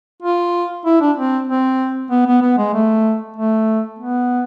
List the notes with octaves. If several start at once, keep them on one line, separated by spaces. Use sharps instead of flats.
F4
E4
D4
C4
C4
B3
B3
B3
G#3
A3
A3
B3